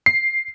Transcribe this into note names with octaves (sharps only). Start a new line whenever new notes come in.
C7